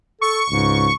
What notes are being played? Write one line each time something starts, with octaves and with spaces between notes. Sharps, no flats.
A4 C#6
C#2 G#2